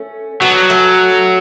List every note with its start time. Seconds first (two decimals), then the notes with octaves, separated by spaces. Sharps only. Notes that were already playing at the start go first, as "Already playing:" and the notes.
Already playing: A3 C#4
0.42 F#3 B3 D4
0.70 A3 C#4